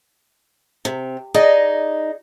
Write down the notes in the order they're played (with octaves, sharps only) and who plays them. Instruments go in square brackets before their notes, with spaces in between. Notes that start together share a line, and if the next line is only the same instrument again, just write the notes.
[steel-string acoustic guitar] C3
[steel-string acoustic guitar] D#4 [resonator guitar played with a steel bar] G#4 D5 D#5